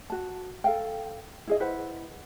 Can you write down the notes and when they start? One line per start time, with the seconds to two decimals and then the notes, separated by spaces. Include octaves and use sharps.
0.10 F#4 A5
0.64 A4 F5 G5
1.47 E4 G#4 D#5
1.60 E4 B4 C5 F#5